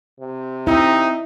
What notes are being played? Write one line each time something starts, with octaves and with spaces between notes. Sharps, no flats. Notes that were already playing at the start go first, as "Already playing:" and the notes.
C3
C4 D#4 E4 E5